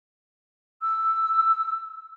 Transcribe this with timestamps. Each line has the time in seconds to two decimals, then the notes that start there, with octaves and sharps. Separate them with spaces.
0.81 E6